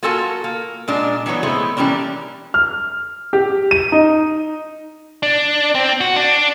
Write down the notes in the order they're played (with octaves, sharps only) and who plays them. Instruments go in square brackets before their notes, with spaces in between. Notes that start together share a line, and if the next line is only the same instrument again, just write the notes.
[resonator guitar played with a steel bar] A#3 F4 F#4 A4 G#5 A5
A#3
A#2 G#3 D4
E3 F#3 B3 C#5
G#3 A3 B3 C4 E4
E3 G3 A#3 C#4 D4
[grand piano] F6
G4
D#7
D#4
[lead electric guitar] D4
C4
F#4
D4